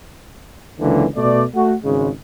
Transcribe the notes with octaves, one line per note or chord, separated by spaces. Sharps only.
C#2 D3 E3 F#3 A#3
B2 A3 D5
A3 F#4
G#1 C#3 G#3